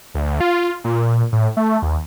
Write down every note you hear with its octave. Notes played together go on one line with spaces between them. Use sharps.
D2
F4
A#2
A2
A3
D#2